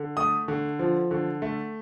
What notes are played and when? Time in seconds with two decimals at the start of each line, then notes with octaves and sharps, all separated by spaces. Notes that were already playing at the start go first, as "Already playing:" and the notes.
Already playing: D3
0.17 A3 D#6
0.48 D3
0.79 F3
1.11 D3
1.42 A3